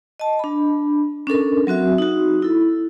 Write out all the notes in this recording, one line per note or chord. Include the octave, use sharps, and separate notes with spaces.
D#5 A5
D4 B5
C#4 D4 A4 A#4
F#3 C4 F#4 E5
D#4 F#4
E4 A4